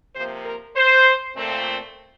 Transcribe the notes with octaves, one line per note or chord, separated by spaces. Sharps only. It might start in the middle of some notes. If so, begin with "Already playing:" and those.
C3 F3 A#3 C5
A#4
C5
A#2 A3 C4